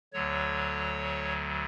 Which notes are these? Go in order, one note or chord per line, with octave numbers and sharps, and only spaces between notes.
D2 D3 F#3 C#5